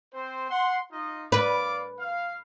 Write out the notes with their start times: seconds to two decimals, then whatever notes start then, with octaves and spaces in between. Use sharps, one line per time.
0.13 C4 C5
0.50 F#5 C6
0.92 D#4 F4 D#5
1.32 B4 D5 F5 D6
1.99 F5